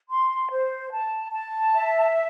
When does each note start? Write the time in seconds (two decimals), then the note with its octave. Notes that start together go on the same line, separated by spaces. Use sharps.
0.09 C6
0.50 C5
0.92 A5
1.32 A5
1.74 E5